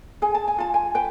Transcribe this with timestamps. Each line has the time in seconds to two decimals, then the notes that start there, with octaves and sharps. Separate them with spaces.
0.22 G#4 G#5
0.35 A5
0.48 G#5
0.58 F4 A5
0.74 G#5
0.95 B4 G5